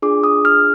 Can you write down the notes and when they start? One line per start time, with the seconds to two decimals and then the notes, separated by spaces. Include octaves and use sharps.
0.02 D4 F4 G#4 D6
0.24 D#6
0.45 F6